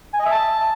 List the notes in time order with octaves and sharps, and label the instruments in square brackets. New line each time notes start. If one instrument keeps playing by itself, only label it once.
[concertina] G#5
D#5
E5
A5